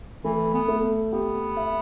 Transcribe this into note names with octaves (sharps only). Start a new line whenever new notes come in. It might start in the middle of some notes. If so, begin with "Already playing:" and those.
E3 A3
B3
A3
B3 G4
E5